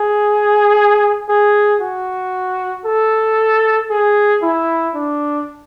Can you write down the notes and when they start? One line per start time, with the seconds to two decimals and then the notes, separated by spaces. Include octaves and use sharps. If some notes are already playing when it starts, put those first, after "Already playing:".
Already playing: G#4
1.29 G#4
1.81 F#4
2.85 A4
3.90 G#4
4.42 E4
4.95 D4